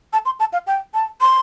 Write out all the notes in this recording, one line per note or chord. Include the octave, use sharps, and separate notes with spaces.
A5
C6
A5
F5
G5
A5
C6